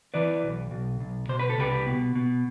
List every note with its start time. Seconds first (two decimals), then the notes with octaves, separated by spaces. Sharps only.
0.14 E3 B4 D5
0.43 B1
0.71 B1
1.00 B1
1.29 B2 C5
1.39 B4
1.50 A4
1.58 C2 G4 B4
1.86 B2
2.15 B2